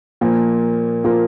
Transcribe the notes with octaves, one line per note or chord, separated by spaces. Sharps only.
A#2 F3 A#3
A#2 F3 A#3